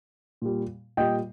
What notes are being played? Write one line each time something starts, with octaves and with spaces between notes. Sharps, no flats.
A#2 G3
A#2 G3 D#5 G5